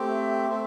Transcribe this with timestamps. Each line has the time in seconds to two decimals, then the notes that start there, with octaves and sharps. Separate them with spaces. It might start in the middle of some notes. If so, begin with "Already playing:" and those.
Already playing: A3 C4 G4
0.09 E5
0.48 A3 C4